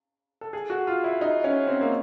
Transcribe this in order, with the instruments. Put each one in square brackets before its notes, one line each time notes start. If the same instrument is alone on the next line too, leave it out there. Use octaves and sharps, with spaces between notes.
[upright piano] A4
G#4
F#4
F4
E4
D#4
C#4
C4
A#3